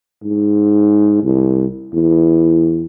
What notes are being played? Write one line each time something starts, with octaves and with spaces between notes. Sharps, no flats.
G#2
C2
E2